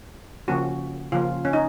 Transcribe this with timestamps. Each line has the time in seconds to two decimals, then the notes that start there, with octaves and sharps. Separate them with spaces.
0.48 C#3 F3 A#3 C#4 F#4
1.12 C#3 F3 A#3 C#4 F4
1.45 C#4
1.53 D#4